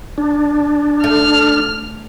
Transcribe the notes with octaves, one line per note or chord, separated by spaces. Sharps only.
D4
A3 F6